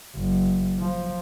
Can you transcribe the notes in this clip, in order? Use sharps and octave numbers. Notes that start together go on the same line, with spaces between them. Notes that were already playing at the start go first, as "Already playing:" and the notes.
F#1
F3